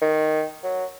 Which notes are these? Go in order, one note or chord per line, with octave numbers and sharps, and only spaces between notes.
D#3
F#3